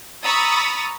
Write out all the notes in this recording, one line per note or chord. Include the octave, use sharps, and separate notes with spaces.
A#5 B5 C#6 D#6 E6 A6